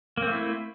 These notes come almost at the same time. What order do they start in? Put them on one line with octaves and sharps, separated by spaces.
A#3 C4 A3 E4